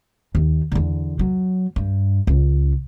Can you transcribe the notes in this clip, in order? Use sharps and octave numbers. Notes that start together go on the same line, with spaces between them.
D#2
E2 D3
F#3
G2
C#2